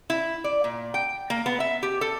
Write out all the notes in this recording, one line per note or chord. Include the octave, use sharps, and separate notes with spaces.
E4
D5
A#2
G5
A#3
B3
E5
G4
A4